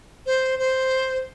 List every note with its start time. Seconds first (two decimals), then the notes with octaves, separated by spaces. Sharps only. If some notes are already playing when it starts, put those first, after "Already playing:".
0.26 C5
0.59 C5